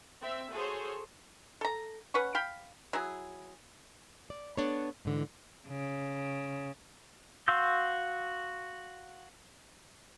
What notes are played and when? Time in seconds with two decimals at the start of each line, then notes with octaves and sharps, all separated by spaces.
0.21 C4 E5
0.52 F#4 G#4 A4 C5 C#5
1.61 A4 A#5
2.14 C#4 B4 F#5 C#6
2.35 F5 G5 B5
2.93 F#3 E4 G#4
4.30 D5
4.57 B3 D4 A4 C#5
5.05 G#2 D3 E3
5.68 C#3
7.48 F#4 F5 C6 E6 G6